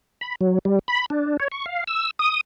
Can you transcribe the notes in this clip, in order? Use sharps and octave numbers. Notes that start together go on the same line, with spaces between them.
B5
F#3
G3
B5
D4
C#5
C#6
F5
E6
D#6